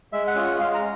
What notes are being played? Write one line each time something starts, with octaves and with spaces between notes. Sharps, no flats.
G#3 E5
F#5
C#4 F4 G#4
F#5
G#3 F5
A#5